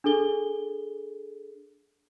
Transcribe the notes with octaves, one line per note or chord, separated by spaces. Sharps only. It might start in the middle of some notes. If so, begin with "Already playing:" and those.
D4 G#4 A4 G7